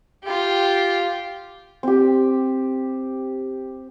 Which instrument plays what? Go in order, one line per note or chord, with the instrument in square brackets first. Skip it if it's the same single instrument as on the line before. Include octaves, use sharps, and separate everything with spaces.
[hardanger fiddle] F4 G4
[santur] C4 G4